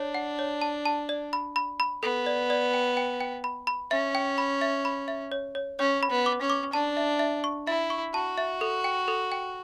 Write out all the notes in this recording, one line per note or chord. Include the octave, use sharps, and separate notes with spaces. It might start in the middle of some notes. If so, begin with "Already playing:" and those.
Already playing: D4 C#5
F#5
C#5
A5
A5
D5
B5
B5
B5
B3 A4
D5
D5
G5
G5
G5
B5
B5
C#4 E5
G5
B5
E5
B5
E5
C#5
C#5
C#4 C#5
B5
B3
D6
C#4
D6
D4 A5
E5
E5
C#6
E4 E5
C#6
F#4 A5
E5
A4
G5
A4
G5